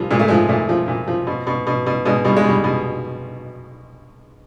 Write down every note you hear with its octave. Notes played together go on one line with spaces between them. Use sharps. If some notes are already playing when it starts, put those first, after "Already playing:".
Already playing: A#2 F3 G3
A#2 G#3
A3
F3 G#3
A#2 A3
F3
A#2
F3
B2
B2
B2
B2
B2 G#3
B2 G3
G#3
B2 G3
B2